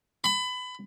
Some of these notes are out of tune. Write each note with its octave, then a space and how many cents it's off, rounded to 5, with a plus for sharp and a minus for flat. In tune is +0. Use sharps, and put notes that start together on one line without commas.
B5 +25